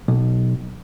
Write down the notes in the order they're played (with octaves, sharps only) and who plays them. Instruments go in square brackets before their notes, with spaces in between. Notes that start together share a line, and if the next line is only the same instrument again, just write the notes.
[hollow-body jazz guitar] B1